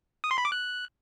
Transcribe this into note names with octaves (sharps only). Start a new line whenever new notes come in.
D#6
C6
B5
D6
F#6